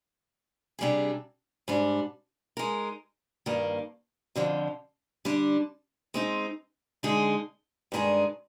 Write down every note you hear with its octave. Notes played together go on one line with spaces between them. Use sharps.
C3 G3 D4 G#4
G#2 G3 D4
G#3 D#4 A#4
G2 D#3 A#3
F2 D3 F3
D3 G3 D4
G#3 C4 D#4
D3 G#3 D#4 G#4
G2 D#3 G#3 D4 G#4